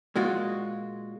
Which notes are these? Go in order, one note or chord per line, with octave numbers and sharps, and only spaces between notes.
A#2 G#3 F4 F#4